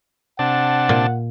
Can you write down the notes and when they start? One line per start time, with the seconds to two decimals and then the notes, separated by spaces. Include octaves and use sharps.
0.39 C3 D4 F#5 A5
0.89 A#2